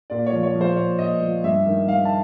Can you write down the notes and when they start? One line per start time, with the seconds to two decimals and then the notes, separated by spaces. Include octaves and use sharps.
0.10 A#2 D5
0.26 C#5
0.32 F3
0.43 C#5
0.55 F3
0.61 C5
0.76 A#2 C#5
0.99 A#2 D#5
1.21 F3
1.44 G2 E5
1.66 D#3
1.87 D#3 F5
2.05 A5